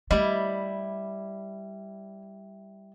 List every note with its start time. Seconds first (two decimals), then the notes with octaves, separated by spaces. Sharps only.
0.11 G3 A3 E4 D#5